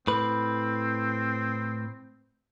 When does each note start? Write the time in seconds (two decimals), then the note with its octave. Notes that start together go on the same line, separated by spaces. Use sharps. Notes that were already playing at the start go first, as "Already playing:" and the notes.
0.07 A2 C4 B4